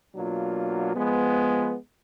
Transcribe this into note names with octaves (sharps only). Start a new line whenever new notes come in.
B2 F#3 A#3 D4 F4
F3 G#3 B3